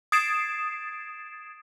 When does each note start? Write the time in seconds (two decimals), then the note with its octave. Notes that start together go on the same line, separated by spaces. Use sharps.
0.12 D#6 G#6 A6 C7 D7 E7